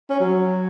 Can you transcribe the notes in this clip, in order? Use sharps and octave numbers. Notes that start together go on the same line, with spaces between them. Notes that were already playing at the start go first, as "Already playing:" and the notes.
C#4
F#3